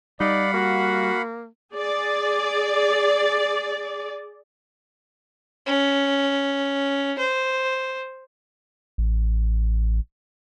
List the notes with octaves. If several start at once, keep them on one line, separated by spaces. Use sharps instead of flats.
G3 D#4 D5 F5 F#5 B5
A#3 F#4
G#4 D5
C#4
C5
A1